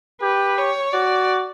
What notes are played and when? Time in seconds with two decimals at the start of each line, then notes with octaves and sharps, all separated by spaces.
0.21 G4 B4
0.58 C#5
0.93 F#4 D5